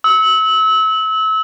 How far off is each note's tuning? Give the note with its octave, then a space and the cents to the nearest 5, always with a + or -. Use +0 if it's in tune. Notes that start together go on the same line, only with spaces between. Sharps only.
E6 -30